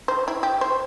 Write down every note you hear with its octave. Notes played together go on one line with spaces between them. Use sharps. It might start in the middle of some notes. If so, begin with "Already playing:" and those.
C5
E4
G4
C5